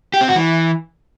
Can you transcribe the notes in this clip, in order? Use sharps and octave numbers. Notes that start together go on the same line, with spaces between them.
G4
C4
F#4
E3